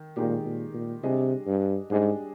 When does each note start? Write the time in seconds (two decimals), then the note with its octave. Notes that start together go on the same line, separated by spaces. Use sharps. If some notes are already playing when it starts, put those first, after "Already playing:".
Already playing: D#3
0.16 A#2 D#3 G#3 D#4 G4
0.45 A#2
0.74 A#2
1.03 C3 G3 D4 G#4 D#5
1.47 G2
1.90 G#2 G3 D4 G#4 D#5